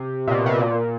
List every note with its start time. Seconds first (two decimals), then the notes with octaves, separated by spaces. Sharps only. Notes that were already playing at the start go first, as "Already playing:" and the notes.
Already playing: C3
0.27 A#2
0.31 B2
0.46 C3
0.60 A#2